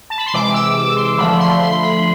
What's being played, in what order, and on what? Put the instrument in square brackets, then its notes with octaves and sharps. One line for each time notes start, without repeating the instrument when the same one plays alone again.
[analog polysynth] A5
B5
C6
C3 E3 G#3 D6
E6
D6
C6
D3 F3 A3 B5
C6
C6
B5